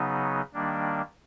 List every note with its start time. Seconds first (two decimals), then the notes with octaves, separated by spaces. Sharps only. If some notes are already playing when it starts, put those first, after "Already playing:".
Already playing: C#3 F#3 B3 D#4
0.53 D#3 G3 A#3 D4